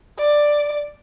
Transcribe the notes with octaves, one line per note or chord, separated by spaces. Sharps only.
D5